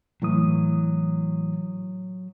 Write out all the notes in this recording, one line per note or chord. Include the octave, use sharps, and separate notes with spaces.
A2 E3 F#3 D#6